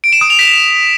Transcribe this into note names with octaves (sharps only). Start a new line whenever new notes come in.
D7
E7
D#6
F7
B6